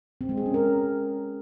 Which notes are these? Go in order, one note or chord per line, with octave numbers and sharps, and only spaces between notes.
C4
G#3
G#4
C#4
A#4